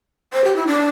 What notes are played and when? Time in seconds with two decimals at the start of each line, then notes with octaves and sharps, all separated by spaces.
0.33 C5
0.44 G4
0.56 E4
0.67 D4